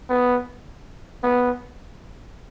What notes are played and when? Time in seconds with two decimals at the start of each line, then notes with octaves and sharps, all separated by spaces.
0.09 B3
1.23 B3